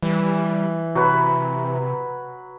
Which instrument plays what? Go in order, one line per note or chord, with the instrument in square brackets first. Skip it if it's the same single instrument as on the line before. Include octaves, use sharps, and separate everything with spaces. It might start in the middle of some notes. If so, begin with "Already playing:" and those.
[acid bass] E3 [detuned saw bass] G3
[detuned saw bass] C3 [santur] F#3 B4